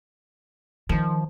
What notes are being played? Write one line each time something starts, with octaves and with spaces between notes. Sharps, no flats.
D#3 F3